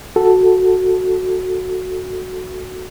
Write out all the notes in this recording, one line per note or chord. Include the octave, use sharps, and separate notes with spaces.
F#4 A4